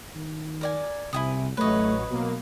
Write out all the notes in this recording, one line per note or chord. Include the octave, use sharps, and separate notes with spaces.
D#3
A#4 D5 G#5
C2 C3 E4 G#5 D#6
A1 F#3 A3 B4 C#5 D#5
B2 F#3 A#3